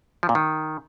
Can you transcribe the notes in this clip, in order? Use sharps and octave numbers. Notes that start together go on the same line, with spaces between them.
F3
A#2
D#3